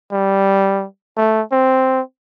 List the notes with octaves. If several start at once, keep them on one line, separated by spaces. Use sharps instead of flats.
G3
A3
C4